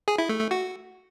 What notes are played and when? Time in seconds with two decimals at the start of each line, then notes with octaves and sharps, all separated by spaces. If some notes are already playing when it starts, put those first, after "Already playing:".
0.08 G#4
0.18 E4
0.29 A3
0.40 A3
0.51 F#4